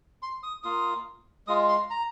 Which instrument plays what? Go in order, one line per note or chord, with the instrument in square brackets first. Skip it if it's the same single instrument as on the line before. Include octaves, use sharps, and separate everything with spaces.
[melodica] C6
D#6
A#3 F4 D#6
G#3 F4 D#6
C6
A#5